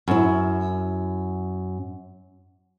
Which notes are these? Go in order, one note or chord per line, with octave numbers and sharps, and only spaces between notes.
F#2 E4